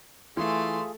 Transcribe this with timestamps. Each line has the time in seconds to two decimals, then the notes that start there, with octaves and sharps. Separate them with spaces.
0.37 E3 A3 F4 G#4 C6